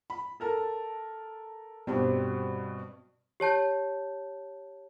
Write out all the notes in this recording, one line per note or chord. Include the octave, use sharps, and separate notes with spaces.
B5
A4 A#4 A5
G2 B2 G3 C4 G4
G4 C#5 A5 G6